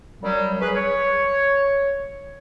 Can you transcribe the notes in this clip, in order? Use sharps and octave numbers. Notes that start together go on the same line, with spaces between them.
F#2 F#3 G3
C#4 G#4 B4
C#5